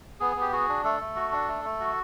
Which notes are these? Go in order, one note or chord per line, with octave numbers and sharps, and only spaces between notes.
B3 G#4
B3 G4
F#4 G#4
D4
A3 A4
A3
F#4
D4
A3
A3
F#4